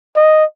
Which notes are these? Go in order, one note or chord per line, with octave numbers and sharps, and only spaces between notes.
D#5